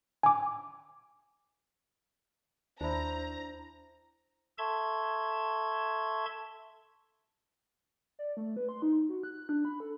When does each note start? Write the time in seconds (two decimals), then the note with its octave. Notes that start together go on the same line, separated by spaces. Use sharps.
0.23 G#5 D6
2.81 D#2 D4 E4 C5 A#5
4.58 A4 E5 A5 C6 C#6 G#6
8.19 D5
8.37 A3
8.56 B4
8.69 C6
8.82 D#4
9.09 F#4
9.23 F#6
9.49 D4
9.65 B5
9.80 A4